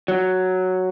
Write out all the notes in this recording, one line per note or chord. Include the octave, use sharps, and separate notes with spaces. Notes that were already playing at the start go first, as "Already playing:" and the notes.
F#3